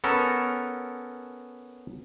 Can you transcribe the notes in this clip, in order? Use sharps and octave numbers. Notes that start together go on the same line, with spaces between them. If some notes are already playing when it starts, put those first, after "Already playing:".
B3 C#4 A4 A#4